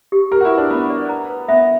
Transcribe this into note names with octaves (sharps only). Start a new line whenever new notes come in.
G4
G4 A#4
F#4
E4
B4
D4
B3 B5
D5
A#5
B4
B3 E5